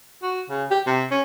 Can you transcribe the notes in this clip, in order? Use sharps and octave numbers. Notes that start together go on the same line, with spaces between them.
F#4
C#3
G4
C3
C#4